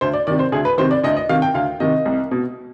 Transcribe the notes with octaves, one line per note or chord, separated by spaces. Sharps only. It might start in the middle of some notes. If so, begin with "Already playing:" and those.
D2 C5
D5
C3 D#3 D5
C5
D2 G#4
B4
C3 D#3 C5
D5
D2 D#5
D#5
C3 D#3 F5
G5
D2 F5
C3 D#3 D#5
C2
B2